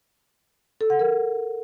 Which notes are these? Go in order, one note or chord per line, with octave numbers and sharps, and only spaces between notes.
A4
F#5
A#4